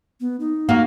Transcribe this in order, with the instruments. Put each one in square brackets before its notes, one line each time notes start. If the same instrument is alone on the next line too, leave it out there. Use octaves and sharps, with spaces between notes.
[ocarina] B3
D#4
[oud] A#3 F4 F#4